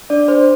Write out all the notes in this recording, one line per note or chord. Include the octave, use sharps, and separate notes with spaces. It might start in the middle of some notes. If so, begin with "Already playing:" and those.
D4 D5
G#4 C5